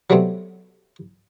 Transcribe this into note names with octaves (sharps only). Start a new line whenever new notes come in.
F#3 G3 A3 B3 C4